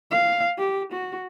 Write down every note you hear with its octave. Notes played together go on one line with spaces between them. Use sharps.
F5
G4
F#4